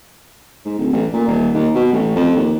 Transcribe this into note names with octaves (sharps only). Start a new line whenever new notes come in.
G#2
D1
A1
A#2
D#1
D#2
B2
A1
F2
D#2